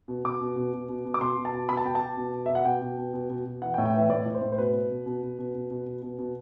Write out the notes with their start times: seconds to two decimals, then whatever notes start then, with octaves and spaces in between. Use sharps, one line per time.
0.08 B2
0.24 B2 D6
0.41 B2
0.56 B2
0.73 B2
0.89 B2
1.05 B2
1.14 D6
1.20 B2 C6
1.37 B2
1.45 A5
1.53 B2
1.69 B2 B5
1.77 A5
1.85 B2 G5
1.95 A5
2.01 B2
2.17 B2
2.33 B2
2.46 B2 E5
2.55 F#5
2.65 B2 G5
2.81 B2
2.98 B2
3.13 B2
3.29 B2
3.45 B2
3.62 E3 F#5
3.74 G5
3.78 A2
3.85 G5
3.94 E3 E5
4.09 A2 D5
4.26 A2
4.34 C5
4.42 A2
4.52 C5
4.58 B2 B4
4.73 B2
4.90 B2
5.06 B2
5.23 B2
5.39 B2
5.54 B2
5.70 B2
5.86 B2
6.02 B2
6.18 B2